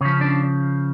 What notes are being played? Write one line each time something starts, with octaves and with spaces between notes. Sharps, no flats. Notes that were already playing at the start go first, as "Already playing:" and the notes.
C#3 F3 C#4
D4